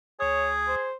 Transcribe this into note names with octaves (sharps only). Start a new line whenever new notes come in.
D2 G#4 C#5 D#6
C5